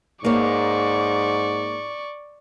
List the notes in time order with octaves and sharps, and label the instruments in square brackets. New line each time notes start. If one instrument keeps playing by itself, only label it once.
[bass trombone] G#2 [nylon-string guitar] A#3 C#5 [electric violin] D5 C#6